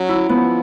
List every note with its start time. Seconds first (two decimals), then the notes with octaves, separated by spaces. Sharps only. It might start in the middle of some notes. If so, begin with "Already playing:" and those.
Already playing: F#3 C#4
0.09 E4
0.29 F3 B3